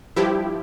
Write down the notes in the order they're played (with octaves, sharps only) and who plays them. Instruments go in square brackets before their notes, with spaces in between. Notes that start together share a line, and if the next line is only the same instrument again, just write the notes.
[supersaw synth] G2 F3 E4 G4